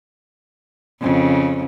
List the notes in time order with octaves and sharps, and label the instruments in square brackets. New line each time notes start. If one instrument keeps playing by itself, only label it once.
[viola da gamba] F2 C#3